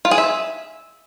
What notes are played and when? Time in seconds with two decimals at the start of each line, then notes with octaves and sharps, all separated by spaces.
0.05 F4
0.11 G#4
0.18 E5